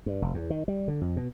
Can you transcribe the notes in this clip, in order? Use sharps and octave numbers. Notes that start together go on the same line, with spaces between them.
G2
F1
E2
D#3
G3
D3
F2
B2